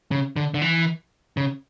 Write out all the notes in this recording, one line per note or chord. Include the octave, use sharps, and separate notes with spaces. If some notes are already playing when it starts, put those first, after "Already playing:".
C#3
D3
D3
E3
C#3